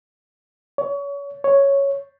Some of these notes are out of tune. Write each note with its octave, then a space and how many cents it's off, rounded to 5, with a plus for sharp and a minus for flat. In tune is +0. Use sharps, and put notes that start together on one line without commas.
C#5 +30
C#5 +0